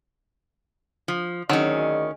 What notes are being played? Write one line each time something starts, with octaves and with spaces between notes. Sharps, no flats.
F3
D2 D#3 F#3 C#4 G#4 D#5